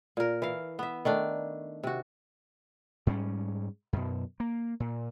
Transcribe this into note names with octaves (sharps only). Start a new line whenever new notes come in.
A#2 A#4
E3 F5
B3 E5
D#3 A3 D4
C3 F#4
G#2 G3 A#3 C#4
F#2 B2
A#3
A#2